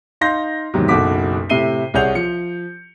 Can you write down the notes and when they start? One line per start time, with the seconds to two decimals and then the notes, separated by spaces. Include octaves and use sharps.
0.21 D#4 F5 C6 G6 A#6
0.74 E2 G#2 C3 D#3 F#3
0.88 F#1 B1 F#4 A4 D6 B6
1.50 A2 C3 E5 C7 D#7 G7
1.94 C2 G#4 C#5 F#5 G6 F7
2.15 F3 C#7